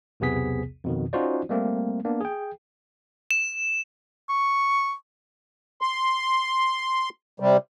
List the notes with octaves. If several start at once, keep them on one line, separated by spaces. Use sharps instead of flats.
B1 E2 C3 B3 G#4 B6
F2 B2 D#3
C#4 D#4 F4 F#4 C5 D5
G3 A3 A#3 C4
A#3 B3 D4
G#4 G5
E7
C#6
C6
C3 G3